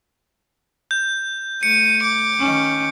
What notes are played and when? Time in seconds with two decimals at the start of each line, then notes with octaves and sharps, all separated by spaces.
0.91 G6
1.63 A3 C#7 D#7
2.04 D6
2.39 D#3 C#4